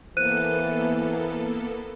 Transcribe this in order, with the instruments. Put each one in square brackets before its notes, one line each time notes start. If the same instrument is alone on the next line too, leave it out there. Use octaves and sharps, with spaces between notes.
[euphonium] E3 [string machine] A#3 B3 A4 [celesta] C5 F#6 D#7